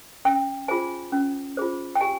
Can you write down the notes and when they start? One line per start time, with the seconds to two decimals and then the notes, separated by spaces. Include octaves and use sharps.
0.25 C#4 G5
0.68 F4 G#4 C5 G#5
1.12 C#4
1.57 F4 G#4 C5
1.95 G5
2.01 G4 G#5